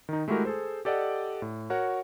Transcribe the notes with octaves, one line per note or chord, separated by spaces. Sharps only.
D#3 D#4
G#3 A3 E4 F#4 G4 A#4
G#4 A4 C5
G4 A4 D5 D#5 F#5
A2
F#4 A#4 C#5 F#5